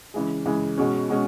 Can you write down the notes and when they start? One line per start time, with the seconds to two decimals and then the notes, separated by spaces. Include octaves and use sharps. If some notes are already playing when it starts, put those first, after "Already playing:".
0.14 C#3 E3 G#3
0.46 C#3 E3 G#3
0.77 B2 G#3 C#4
1.10 B2 G#3 C#4